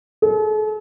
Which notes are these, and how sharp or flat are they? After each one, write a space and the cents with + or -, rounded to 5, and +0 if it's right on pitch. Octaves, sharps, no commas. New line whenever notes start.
A4 -45